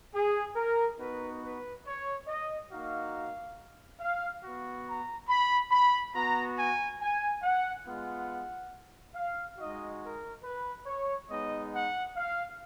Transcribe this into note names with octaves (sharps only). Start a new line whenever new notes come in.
G#4
A#4
B3 D#4 F#4 B4
B4
C#5
D#5
A#3 D#4 F#4 F5
F5
B3 F#4
A#5
B5
B5
B3 F#4 A#5
G#5
G#5
F#5
G#3 B3 F4 F#5
F5
G#3 D#4 F#4 D#5
A#4
B4
C#5
G#3 B3 D#4 D#5
F#5
F5